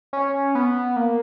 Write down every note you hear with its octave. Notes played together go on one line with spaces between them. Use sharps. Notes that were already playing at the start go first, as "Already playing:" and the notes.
C#4
B3
A#3